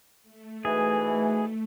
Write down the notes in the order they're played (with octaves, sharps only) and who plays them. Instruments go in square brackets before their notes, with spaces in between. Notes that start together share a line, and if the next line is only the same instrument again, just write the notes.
[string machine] A3
[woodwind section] G#2 B2 E3 [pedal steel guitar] G#4